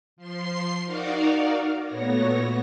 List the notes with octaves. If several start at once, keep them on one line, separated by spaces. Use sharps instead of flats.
F3 C6 C7
D#4 F#4 A#4 D5 F5
A#2 A3 B3 F#4 C#5 A#6